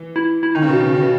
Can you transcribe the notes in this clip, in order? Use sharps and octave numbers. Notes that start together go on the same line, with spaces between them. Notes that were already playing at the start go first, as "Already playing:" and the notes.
Already playing: E3
E4
E4
D#3 D#4
C#3
B2
C#3
C#3
B2